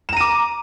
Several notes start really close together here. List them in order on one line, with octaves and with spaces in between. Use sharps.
E7 A#5 D#7 D6